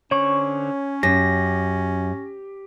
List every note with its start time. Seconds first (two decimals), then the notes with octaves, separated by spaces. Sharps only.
0.11 D3 C#4 C5 C#5 C#6
1.03 F#2 G4 A#6